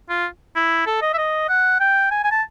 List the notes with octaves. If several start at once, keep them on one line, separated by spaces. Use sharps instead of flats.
F4
E4
A4
D#5
E5
D#5
F#5
G5
G#5
G#5
A5